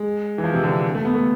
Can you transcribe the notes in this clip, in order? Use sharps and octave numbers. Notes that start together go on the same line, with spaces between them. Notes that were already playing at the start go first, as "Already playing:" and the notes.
Already playing: G#3
E3
F3
C3
D3
A3
B3
A3